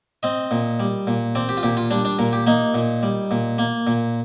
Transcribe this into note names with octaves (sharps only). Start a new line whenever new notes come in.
C4 D#5
A#2
G3
A#2
C4 D5
G4
F4
A#2 G4
F4
G3 D4
D4
A#2 A#4
G4
A#3 D#4
A#2
G3
A#2
A#3
A#2